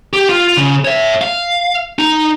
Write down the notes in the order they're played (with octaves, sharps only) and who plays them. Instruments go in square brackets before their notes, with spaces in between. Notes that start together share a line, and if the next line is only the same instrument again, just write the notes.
[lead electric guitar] G4
F4
C#3
C#5 E5
F5
D#4